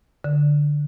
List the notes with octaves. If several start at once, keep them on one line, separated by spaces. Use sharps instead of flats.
D3